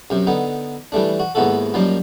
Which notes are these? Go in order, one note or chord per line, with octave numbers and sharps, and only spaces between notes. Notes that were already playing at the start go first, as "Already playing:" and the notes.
F#2 C3
D3 B3 D#4
E3 G3 A3 D4
F#4
D#2 G#2 B3 E4 F#4 A4
F#2 F3 G3 A#3 D#4